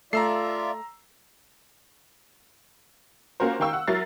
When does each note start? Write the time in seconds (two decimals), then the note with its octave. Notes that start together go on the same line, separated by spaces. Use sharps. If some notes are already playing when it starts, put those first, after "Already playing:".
0.13 A3 F4 D5 E5 A#5 E6 C7
3.40 A#3 C#4 F4 F#4 A#4 C5
3.60 D#3 A#4 F5 G5 C#6 E6
3.73 F#5
3.87 F#3 E4 A#4 A6 C7